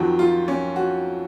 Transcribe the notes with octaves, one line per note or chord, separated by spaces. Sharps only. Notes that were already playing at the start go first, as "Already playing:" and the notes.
Already playing: F2 D#3 F#3 F#4
F4
C#4
F#4